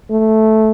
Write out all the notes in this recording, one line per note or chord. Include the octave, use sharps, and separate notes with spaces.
A3